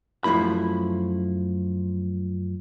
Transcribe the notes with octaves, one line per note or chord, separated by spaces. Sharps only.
F#2 F3 A3 E4 B5